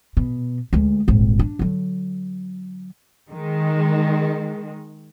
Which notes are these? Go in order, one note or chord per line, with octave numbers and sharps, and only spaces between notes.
B2
D2 G#3
D#1 G#1
D4
D3 F#3
D#3 G#3